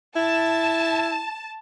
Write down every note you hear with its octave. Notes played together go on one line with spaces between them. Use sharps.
E4 A5